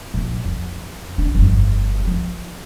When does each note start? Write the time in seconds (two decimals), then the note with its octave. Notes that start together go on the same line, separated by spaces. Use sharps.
0.14 A#1
0.45 F2
1.18 D4
1.35 G1 F2
2.07 F3